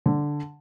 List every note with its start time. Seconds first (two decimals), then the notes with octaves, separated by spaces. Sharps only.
0.06 D3